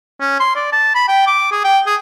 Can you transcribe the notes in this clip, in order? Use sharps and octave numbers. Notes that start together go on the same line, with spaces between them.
C#4
C6
D5
A5
B5
G5
D6
G#4
G5
G#4